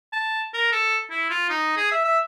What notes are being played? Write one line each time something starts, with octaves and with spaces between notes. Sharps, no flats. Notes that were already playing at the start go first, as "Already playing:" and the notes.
A5
A#4
A4
E4
F4
D#4
G#4
E5
E5